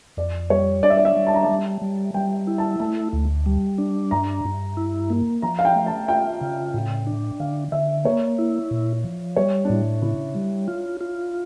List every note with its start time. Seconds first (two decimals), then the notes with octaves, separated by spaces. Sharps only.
0.17 F2 D5
0.50 G3 C#5
0.83 D4 D5
0.90 E5
0.97 D5
1.05 E5
1.16 G3
1.27 A5
1.35 A#5
1.43 A5
1.49 G3
1.82 G3
2.14 G3 G5
2.47 E4
2.58 A5
2.80 A3 A5
3.13 D2
3.46 G3
3.78 D4
4.11 G2 A#5
4.45 G2
4.77 E4
5.10 A#3
5.42 F3 A#5
5.59 F5
5.65 G5
5.75 A3
5.86 A5
6.08 F4 G5
6.41 C#3
6.74 A2
7.07 D4
7.40 D3 F5
7.72 D3 E5
8.05 A#3 C#5
8.39 E4
8.71 A#2
9.04 F3
9.36 G3 C#5
9.65 D4
9.69 A2 E4
10.02 C#3 E4
10.35 G3
10.68 F4
11.01 F4